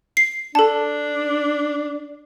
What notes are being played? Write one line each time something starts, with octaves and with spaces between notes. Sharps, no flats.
C7
D4 A4 A5